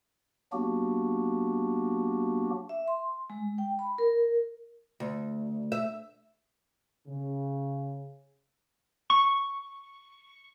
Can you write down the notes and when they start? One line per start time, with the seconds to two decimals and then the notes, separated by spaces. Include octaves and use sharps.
0.52 F#3 A#3 B3 D4 F#4 G4
2.69 E5
2.88 C6
3.30 G#3
3.58 G5
3.79 B5
3.98 A#4
5.00 D2
5.72 E5
7.08 C#3
9.10 C#6